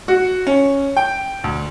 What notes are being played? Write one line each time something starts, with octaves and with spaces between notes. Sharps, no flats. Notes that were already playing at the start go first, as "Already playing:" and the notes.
F#4
C#4
G5
D2